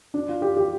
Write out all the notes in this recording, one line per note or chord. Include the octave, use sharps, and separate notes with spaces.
D4
F4
G4
G4